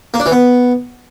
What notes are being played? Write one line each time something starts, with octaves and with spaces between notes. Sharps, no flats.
A#3
D4
E3
B3